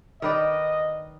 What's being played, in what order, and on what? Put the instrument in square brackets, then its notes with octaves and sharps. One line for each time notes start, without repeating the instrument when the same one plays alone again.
[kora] D#3 B4 D5 [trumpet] D#5